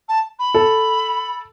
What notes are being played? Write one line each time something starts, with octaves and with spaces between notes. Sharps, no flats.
A5
B5
A4